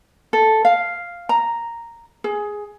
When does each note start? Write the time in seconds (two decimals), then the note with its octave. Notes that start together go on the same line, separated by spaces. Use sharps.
0.33 A4
0.65 F5
1.29 A#5
2.24 G#4